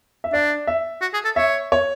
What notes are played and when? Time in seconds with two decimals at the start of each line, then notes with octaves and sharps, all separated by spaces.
0.24 E5
0.33 D4 D5
0.67 E5
1.02 F#4
1.14 G#4
1.25 A4
1.36 C#5 E5
1.72 C#5